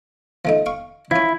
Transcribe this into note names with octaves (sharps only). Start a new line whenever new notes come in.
F3 A3 D#4
F5 C#6
F3 C#4 E4